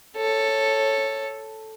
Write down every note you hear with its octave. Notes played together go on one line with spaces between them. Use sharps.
A4 C#5